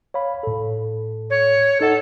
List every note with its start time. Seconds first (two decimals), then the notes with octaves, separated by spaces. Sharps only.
0.14 C#5 F5 B5
0.43 A2 A4
1.30 C#5
1.81 D#4 A4 D#5 F#5